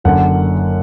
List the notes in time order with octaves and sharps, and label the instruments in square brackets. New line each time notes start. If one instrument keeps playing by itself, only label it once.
[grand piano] F#1 F#2 D3 F#5